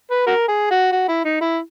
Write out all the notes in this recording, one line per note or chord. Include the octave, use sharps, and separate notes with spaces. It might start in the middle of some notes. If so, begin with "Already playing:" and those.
B4
F#4 A#4
G#4
F#4
F#4
E4
D#4
E4